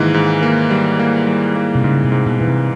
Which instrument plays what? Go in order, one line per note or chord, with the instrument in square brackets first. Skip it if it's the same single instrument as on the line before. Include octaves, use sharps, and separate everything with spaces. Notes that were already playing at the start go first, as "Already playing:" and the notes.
Already playing: [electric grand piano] G#2 E3 A#3 [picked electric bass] D#3
[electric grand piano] G#2
A#3
G3
A#3
G3
A#3
[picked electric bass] C3
[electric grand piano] G#2 [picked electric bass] C#3
[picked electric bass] C3
[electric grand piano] G#2
[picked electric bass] B2
[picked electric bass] B2 [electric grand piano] E3
[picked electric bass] C3